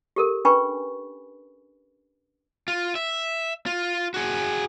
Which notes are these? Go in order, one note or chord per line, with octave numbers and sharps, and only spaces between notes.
G4 A4 A#4
C#4 D4 B4 G#5 B5 C#6
F4
E5
F4
F#4 G#4